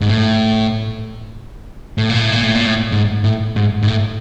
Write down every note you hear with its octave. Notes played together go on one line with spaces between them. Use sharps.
G#2
A2
A2
A#2
A2
A#2
A2
A#2
A2
G#2
A2
G#2
G#2
A2